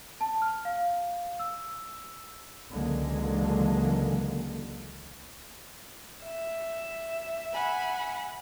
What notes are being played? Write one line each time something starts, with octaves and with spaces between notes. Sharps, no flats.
A5
F6
F5
E6
C#2 D3 E3 F#3 G#3 A#3
E5
F#5 G#5 B5